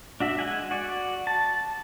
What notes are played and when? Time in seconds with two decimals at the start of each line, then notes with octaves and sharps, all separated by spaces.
0.20 D4 F#4 E5
0.39 G#3 F#5 G#5
0.71 F#4 D5
1.27 A5